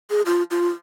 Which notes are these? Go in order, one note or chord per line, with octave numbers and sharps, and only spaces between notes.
G#4
F4
F4